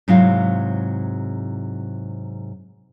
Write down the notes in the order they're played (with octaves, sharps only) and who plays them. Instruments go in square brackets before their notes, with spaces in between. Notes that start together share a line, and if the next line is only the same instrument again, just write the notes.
[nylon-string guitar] G#2 C3 F#3 E4 F5